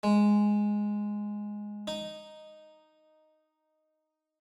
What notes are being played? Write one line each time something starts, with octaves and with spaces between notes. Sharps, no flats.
G#3
D#4